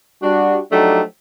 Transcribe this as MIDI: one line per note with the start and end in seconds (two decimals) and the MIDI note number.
0.23 0.59 55
0.23 0.59 62
0.23 0.59 66
0.72 1.02 53
0.72 1.02 54
0.72 1.02 57
0.72 1.02 62
0.72 1.02 63
0.72 1.02 67